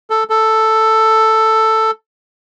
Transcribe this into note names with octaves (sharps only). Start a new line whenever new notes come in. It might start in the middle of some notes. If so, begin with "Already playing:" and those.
A4
A4